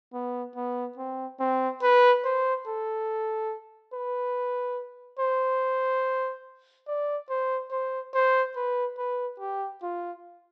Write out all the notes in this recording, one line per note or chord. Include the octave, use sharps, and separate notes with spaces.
B3
B3
C4
C4
B4
C5
A4
B4
C5
D5
C5
C5
C5
B4
B4
G4
F4